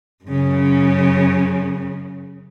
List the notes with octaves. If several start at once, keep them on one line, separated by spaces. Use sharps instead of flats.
F#2 C#3